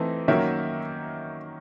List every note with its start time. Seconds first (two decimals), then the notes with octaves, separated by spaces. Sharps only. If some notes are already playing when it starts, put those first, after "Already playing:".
Already playing: E3 A3 C4 D#4
0.28 D#3 F#3 A#3 C#4 E5